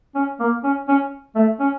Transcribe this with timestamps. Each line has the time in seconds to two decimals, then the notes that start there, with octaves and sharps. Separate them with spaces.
0.15 C#4
0.40 A#3
0.64 C#4
0.88 C#4
1.36 A3
1.60 C#4